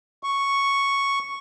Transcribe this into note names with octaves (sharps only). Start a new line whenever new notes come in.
C#6